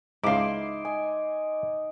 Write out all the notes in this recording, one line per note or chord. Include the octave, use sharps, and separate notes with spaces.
C#2 G#2 D#4 E4 F5 C6 D6
D#5 G#5